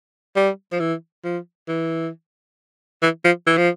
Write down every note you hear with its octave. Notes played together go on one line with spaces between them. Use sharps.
G3
F3
E3
F3
E3
E3
F3
E3
F3